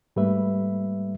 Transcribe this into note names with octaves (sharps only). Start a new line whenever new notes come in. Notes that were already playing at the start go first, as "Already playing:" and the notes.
G#2 G3 A3 A#3 B4 E5